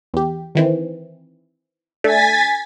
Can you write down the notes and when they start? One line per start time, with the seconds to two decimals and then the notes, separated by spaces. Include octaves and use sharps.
0.14 E2 G4
0.55 D#3 E3 C4
2.04 A3 D4 G#5 A6 B6